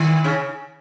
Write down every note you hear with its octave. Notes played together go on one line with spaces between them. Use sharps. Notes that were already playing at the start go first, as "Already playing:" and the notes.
Already playing: D#3
C#3 C#4